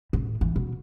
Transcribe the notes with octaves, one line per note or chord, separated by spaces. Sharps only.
A2
E3
B2